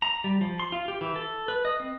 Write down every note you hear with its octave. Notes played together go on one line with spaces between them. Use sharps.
A#5
G3
F3
C6
F4
G4
E3
A4
B4
D#5
C4